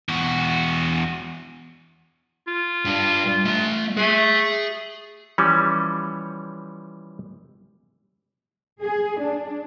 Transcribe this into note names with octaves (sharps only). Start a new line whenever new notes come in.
E2 F#4
F4
G2
A3 C6
A3 G#4
E3 F3 G3 C#4
G#4
D4